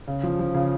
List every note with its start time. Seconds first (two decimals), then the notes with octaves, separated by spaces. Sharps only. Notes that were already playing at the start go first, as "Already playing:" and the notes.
0.07 C#3
0.23 F3
0.39 F3
0.54 C#3